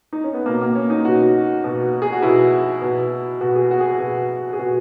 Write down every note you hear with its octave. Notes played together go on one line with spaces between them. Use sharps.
D#4
C#4
B3
B2 A#3
A#3
C#4
D#4
B2 F#4
B2
G#4
F#4
B2 E4
B2
B2 F#4
G#4
F#4
F#4
G#4
B2
G#4
B2 F#4